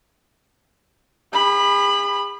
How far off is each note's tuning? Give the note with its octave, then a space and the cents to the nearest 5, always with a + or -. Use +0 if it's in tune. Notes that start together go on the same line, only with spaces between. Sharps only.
G#4 -45 B5 +0